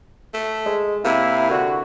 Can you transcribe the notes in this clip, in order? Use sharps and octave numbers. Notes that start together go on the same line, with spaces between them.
A3
G#3
C3 A#3 E4
D3 F#4